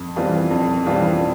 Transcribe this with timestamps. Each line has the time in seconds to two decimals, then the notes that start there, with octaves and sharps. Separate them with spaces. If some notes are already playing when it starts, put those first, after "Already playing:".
Already playing: F2
0.16 E3 G3 C4 F4
0.51 F2
0.86 E3 G3 C4 F4